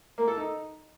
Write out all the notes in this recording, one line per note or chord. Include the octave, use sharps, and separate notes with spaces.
A#3
A4
D#4